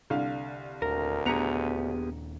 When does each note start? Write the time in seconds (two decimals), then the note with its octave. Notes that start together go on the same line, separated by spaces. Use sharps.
0.10 C2 D3 F5
0.82 D#1 D2 A#4
1.26 D#1 B3 D4 G4 G#4 A#5 C#7 F7